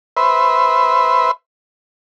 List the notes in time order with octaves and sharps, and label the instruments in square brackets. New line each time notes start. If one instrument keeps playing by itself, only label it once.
[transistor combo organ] B4 C5 E5